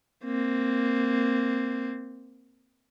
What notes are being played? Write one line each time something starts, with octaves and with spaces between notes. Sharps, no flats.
A#3 C4